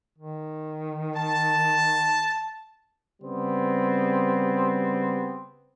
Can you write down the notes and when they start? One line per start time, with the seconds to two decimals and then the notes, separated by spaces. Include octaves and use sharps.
0.18 D#3
1.16 A5
3.22 C#3 G3 B3 C4